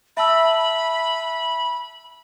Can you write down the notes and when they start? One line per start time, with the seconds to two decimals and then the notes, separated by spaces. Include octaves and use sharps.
0.17 E5 A5 B5 E6